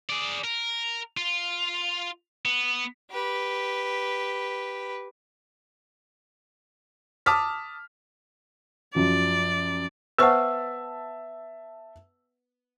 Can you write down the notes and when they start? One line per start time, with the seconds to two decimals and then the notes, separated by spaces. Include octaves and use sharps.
0.09 G#4 D5
0.44 A#4
1.17 F4
2.45 B3
3.11 G4 B4
7.26 A5 D6 D#6 F6 B6
8.95 F#2 F3 F#4 D5
10.19 B3 B4 C5 E5 F#5 A5 C#6 E6